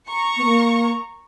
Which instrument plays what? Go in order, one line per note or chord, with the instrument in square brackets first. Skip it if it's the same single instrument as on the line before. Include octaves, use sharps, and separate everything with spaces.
[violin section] A#5 C#6
[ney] B3
A#3